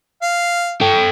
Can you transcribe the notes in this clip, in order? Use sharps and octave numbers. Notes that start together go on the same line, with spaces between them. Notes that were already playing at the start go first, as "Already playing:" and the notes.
F5
A4 G5